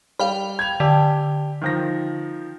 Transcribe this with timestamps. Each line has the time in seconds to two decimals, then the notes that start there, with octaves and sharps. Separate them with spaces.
0.19 G3 F5 G5 B5
0.59 G#6 F7
0.80 D3 G4
1.62 D#3 F3 A#6